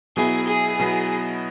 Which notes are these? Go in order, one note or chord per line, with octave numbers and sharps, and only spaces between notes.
B2 F#3 B3 E4 G#4
G#4
B2 F#3 B3 E4